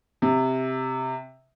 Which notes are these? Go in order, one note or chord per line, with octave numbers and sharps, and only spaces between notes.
C3